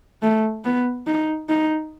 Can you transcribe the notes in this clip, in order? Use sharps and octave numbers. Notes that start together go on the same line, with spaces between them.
A3
B3
D#4
D#4